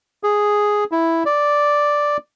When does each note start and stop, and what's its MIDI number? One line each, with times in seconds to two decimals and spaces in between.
0.23 0.84 68
0.92 1.23 64
1.26 2.17 74